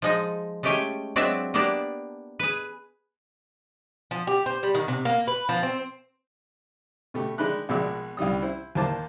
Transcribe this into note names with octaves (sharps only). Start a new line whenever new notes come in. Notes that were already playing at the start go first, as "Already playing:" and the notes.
F3 G#3 D#4
G#3 A3 C#4 G4 G5 G#5
F#3 G#3 C4 D4 F4 E5
A#3 B3 D4 G4 D5 A5
G#4 B4
F3
G4
C5
G3
D#3
C3
A#3
B4
F3
C4
B2 A3 G4
D#3 G#3 D4 D#4 B5 F#6
A#1 B2 G#3 D5 E5
C2 D#3 G3 D#6
E4 C5
D#2 E3 A#3 C5 A5 D6